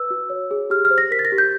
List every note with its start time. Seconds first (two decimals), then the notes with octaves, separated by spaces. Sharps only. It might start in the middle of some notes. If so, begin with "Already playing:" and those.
Already playing: B4 E6
0.11 F#4
0.30 C#5
0.51 G#4
0.70 G4 F6
0.85 F6
0.90 C5
0.98 A#6
1.11 A#4 B6
1.19 A6
1.25 A#6
1.32 G4
1.38 G6